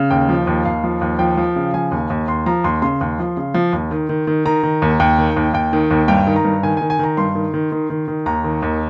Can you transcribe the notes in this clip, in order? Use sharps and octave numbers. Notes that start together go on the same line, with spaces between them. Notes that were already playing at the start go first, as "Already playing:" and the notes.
Already playing: C#3
D#2 G5
F3
D#2
D#2 F5
F3
D#2
F3 G5
F3
C#3
F3 G#5
D#2
D#2
D#2 C6
F3 A#5
D#2 C6
C#3 C6
D#2
F3
C#3
F3
D#2
D#3
D#3
D#3
D#3 A#5
D#3
D#2
D#2 G5
D#3
D#2
D#2 G5
D#3
D#2
G2 G5
D#3
A#5
G2
D#3 G#5
G#5
D#3
G#5
D#3 A#5
G2 C6
D#3
D#3
D#3
D#3
D#3
D#2 A#5
D#3
D#2